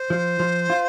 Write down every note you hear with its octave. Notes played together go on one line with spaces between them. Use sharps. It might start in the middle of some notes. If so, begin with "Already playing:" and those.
Already playing: C5
F3
F3
F4